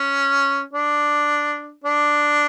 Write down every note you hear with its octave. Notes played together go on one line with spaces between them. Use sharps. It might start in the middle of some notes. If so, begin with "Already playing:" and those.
Already playing: C#4
D4
D4